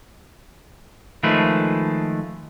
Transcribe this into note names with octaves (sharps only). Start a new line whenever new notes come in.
D#3 F3 G#3 A3 B4